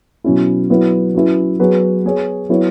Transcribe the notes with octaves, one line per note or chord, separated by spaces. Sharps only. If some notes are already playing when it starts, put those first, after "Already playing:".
B2 F#3 C#4 E4
F#3 B3 E4
F#3 C#4 E4 B4
F#3 B3 G#4 B4
B3 G#4 C#5
F#3 B3 E4 C#5